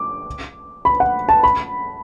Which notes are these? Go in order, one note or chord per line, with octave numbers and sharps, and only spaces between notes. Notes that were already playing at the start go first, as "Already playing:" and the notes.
Already playing: D6
B5
F#5
A5
B5